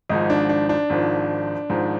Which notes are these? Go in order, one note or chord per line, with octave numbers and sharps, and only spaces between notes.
G#1 G#2 F3 D#4
D4
D4
D4
G#1 G#2 F3
G#1 G#2 F3